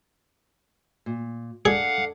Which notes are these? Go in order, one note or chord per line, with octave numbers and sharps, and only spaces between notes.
A#2
D4 G#4 A4 D5 F5 F#5